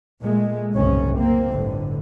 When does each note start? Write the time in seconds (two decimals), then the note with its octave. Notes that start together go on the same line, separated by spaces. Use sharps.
0.22 A#2 G#3 A3
0.74 F#1 C2 G#2 C#4
1.18 A#3 C4
1.51 G1 A2 D3